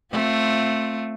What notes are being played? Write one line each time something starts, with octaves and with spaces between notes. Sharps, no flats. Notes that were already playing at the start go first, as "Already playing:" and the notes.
A3 C4 F4